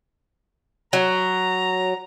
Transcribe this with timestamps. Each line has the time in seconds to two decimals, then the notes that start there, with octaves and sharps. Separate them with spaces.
0.93 F#3 A#5